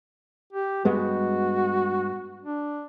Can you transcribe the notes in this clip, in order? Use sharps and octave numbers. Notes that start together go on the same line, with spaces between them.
G4
G2 G#3 B3 F#4
D4